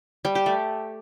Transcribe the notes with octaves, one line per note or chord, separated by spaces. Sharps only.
G3
G4
A3